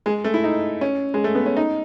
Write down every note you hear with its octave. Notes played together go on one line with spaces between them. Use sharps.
G#3
A3
E4
D#4
C#4
G#3
A3
B3
C#4
D#4